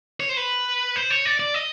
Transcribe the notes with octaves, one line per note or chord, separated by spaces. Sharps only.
C#5
C5
B4
C5
C#5
D5
D5
D#5